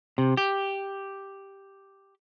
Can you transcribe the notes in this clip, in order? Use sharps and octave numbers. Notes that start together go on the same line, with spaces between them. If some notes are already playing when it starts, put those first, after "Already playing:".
C3
G4